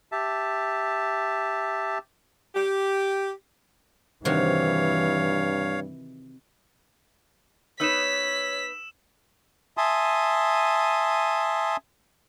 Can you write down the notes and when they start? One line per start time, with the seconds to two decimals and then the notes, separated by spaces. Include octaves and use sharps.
0.12 G4 E5 A5
2.55 G4
4.25 G2 C3 D#3 E3 F#4 C#5 F5
7.80 B3 D#4 B4 C#5 E6 B6 E7
9.77 E5 G#5 A5 C6 D#6